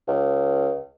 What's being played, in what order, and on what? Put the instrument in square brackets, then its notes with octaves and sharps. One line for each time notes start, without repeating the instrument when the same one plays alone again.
[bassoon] C#2